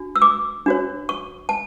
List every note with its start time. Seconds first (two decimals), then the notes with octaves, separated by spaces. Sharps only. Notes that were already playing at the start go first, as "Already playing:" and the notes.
Already playing: D4 F#4
0.16 E6
0.22 D6
0.66 D4 F#4 C#5
1.09 C#6
1.49 A5